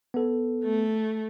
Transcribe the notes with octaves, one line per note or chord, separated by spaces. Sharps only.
B3 A4
A3